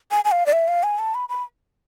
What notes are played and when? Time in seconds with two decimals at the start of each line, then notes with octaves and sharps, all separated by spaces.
0.11 G#5
0.25 G#5
0.32 F5
0.46 D5
0.53 E5
0.68 F5
0.83 G#5
0.99 A5
1.15 B5
1.29 B5